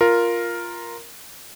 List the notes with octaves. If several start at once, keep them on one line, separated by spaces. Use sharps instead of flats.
F4 A#4